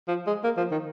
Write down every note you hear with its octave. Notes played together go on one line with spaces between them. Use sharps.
F3
G#3
A#3
F3
D#3